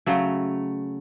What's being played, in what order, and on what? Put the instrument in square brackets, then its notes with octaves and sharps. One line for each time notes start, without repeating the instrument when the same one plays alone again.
[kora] C#3 F#3 A3